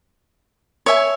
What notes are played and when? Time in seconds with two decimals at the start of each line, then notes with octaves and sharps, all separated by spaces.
0.86 C#5 E5 G#5